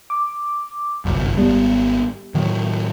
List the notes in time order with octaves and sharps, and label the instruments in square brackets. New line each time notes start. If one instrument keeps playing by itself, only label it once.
[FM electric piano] D6
[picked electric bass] G1 C2 F#2
[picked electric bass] G#1 B3 [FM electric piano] G3
[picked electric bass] A2 D#3 F#3